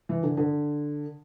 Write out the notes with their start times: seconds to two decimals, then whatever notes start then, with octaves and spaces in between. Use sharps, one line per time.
0.09 E3
0.23 D3
0.37 D3